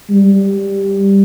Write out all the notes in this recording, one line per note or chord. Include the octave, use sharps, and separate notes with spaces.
G3